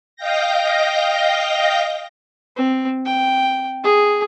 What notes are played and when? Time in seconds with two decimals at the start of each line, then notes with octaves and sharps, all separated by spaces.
0.16 D#5 F5 G5 G6 A#6
2.56 C4
3.06 G5
3.84 G#4